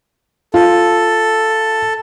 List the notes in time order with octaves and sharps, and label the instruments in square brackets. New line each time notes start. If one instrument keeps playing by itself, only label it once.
[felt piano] F4 [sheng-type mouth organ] A4